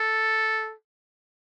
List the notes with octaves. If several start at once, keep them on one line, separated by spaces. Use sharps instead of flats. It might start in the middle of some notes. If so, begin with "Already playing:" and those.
Already playing: A4